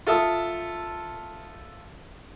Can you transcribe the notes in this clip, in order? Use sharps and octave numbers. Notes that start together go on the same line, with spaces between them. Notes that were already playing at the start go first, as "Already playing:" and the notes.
F4 A4 E5 D#6